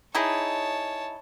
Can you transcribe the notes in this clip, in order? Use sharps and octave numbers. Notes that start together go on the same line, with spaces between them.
D#4 E4 G#4 C#5 A5